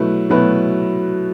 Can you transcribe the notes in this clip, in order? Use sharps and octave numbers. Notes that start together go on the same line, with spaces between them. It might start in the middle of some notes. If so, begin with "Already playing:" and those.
Already playing: B2 F#3 A3 E4 B4
B2 F#3 A3 E4 B4